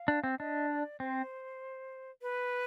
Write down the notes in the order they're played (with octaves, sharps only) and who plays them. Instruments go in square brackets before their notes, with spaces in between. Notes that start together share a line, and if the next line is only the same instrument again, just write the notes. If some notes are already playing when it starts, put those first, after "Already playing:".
Already playing: [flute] F5
[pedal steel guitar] D4
C4
[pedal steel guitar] D4 [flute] D#5
[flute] D5
[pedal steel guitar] C4 [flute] C5
[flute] B4